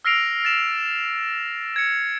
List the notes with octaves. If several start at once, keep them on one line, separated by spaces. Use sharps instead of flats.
E6 F6 A#6 C7 D7 F7
A6 E7
G#6 C#7